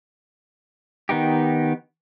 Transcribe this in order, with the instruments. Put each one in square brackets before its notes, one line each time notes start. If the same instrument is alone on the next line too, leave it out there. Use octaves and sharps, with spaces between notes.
[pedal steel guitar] D#3 B3 D#4 G4